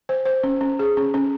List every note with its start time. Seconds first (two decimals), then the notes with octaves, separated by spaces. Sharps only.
0.09 C5
0.25 C5
0.43 C#4
0.61 C#4
0.79 G#4
0.97 C#4
1.14 C#4